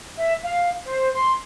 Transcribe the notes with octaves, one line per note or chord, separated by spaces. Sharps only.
E5
F5
C5
C6